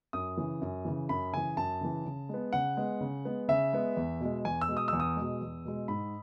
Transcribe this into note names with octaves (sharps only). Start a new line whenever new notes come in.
F#2 D#6
C#3 E3
F#2
C#3 E3
F#2 B5
C#3 E3 G#5
F#2 A5
C#3 E3
C#3
G#3 B3
C#3 F#5
G#3 B3
C#3
G#3 B3
C#3 E5
G#3 B3
E2
B2 G#3
E2 G#5
E6
B2 G#3
D#6
E2 E6
D#6
B2 G#3
E2
B2 G#3
G#2 B5